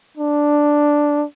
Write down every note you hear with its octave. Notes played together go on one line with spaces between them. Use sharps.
D4